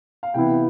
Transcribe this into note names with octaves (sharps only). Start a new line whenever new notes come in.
F5
C3 E3 B3 E4 G5